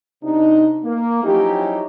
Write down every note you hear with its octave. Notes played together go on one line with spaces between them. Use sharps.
C3 D4 D#4
A#3
F3 F#3 C#4 D#4 E4 G4